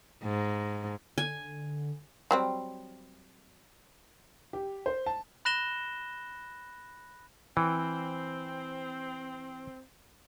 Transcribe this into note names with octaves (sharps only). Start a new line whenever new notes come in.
G#2
D3 G#5
F#3 G3 C4
G4
C5
A5
B5 F#6 A#6 E7 G7
E3 C4